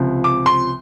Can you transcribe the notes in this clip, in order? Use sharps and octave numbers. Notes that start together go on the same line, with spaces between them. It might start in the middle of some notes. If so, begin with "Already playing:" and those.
Already playing: C#2 C3 F3
D6
C6